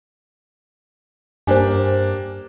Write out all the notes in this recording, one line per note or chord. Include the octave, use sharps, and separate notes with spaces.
G2 A#3 D4 G4 C5 G#5